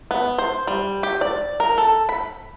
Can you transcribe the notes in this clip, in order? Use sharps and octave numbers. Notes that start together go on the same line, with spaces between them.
B3
C5
G3
G4
D5
A#4
A4
B5